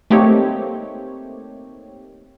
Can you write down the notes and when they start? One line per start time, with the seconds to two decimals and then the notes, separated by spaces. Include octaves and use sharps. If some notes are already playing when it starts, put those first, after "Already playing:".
0.10 A3 A#3 C4 D#4 G4 C#5